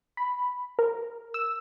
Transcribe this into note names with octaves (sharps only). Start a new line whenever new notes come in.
B5
A#4
E6